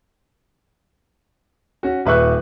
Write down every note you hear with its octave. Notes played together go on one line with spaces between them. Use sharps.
C#4 F#4
D#1 B4 E5 C#6 F#6